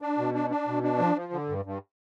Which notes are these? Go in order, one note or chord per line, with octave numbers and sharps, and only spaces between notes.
D4
B2
D4
D4
B2
D4
F3
F3
D3
G2
G2